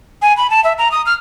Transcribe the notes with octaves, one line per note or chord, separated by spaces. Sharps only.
G#5
B5
A5
E5
A#5
D#6
F6